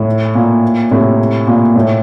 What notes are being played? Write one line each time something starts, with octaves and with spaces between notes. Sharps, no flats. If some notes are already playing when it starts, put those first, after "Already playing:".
Already playing: A2
A#2
A2 C3
A#2
A2